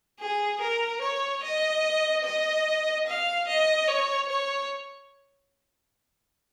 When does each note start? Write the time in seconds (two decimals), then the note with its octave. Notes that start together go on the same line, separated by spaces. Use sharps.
0.20 G#4
0.61 A#4
1.02 C#5
1.43 D#5
2.24 D#5
3.07 F5
3.48 D#5
3.88 C#5
4.29 C#5